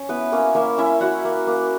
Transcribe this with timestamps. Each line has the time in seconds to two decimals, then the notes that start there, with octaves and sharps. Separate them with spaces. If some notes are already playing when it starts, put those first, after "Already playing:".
Already playing: C#4 C#5
0.09 B3 E4 B4
0.32 A#3 C#4 C#5
0.55 A#3 E4 E5
0.78 C#4 E4 E5
1.01 E4 F#4 F#5
1.25 A#3
1.47 A#3